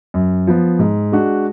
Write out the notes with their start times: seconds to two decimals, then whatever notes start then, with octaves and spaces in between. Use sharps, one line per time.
0.14 F#2
0.47 F3 B3
0.79 G#2
1.12 G#3 D4 F#4